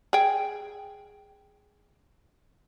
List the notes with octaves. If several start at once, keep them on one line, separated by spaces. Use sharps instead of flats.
G#4 G5